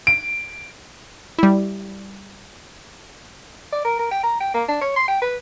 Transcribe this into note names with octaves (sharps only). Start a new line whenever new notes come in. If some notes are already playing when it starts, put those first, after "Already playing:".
D7
G3 E4
D5
A#4
A#4
G5
A#5
G5
A#3
D4
C#5
C6
G5
B4